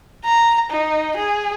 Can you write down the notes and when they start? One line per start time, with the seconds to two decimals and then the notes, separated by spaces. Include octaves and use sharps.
0.25 A#5
0.71 D#4
1.17 G#4